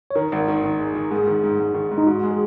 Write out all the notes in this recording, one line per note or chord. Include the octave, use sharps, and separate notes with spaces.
C#5
D#3 A#4
G#1
D#3
D#3
G#3
D#3
G#2 G#4
D#3
G#2
G#2
D#3
G#2
D#4
G#2 F#4
G#3
G#4